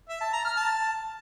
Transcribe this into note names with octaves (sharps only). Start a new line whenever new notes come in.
E5
A5
A#5
F6
A5